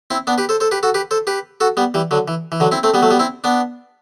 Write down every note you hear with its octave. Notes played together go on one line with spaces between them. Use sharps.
C4 E4
B3 D4
G4 B4
A4 C5
A4 C5
G4 B4
F#4 A4
G4 B4
A4 C5
G4 B4
F#4 A4
G3 B3
E3 G3
D3 F#3
E3
E3
D3 F#3
C4 E4
A3 C4
G3 B3
F#3 A3
G3 B3
C4 E4
B3 D4